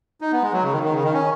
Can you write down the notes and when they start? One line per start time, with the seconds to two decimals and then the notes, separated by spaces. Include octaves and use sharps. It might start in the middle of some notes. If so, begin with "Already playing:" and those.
0.21 D#4
0.32 B3
0.42 G#3
0.53 F#3
0.63 C#3
0.73 D#3
0.83 D#3
0.93 C#3
1.03 D#3
1.14 C#4